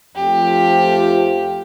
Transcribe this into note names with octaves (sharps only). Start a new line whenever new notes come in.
F2 F3 A3 C4 F4 G4